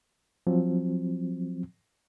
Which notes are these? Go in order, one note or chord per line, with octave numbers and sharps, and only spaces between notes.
F3 F#3 C4